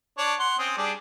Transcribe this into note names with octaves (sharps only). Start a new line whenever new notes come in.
D4 C#5
F#5 C6
C4 C#4 D#6
G3 D4 G#4